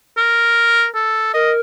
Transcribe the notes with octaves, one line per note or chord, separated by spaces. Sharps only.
A#4
A4
A#4 D#5